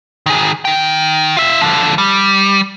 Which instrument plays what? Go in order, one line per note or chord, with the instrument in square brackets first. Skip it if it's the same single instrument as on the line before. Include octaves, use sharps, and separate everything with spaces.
[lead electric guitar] D#3 G#4
D#3 G5
F4 E5
D3 F3
G3